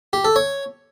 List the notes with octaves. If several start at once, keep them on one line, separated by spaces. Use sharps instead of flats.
G4
A4
C#5